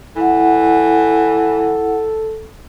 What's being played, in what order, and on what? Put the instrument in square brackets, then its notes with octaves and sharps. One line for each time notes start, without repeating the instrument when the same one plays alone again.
[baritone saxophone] E3 [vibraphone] E4 F#5 [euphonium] A4